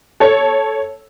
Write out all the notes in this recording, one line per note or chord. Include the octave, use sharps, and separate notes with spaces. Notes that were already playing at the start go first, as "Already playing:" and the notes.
A4 C#5